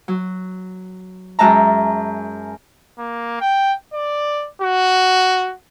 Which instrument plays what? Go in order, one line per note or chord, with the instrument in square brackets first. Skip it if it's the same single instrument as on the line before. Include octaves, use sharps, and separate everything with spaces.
[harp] F#3
F#2 G#3 E5 A5 A#5
[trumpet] A#3
G5
D5
F#4